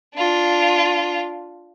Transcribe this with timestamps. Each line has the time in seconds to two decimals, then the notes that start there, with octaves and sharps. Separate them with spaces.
0.15 D4 F4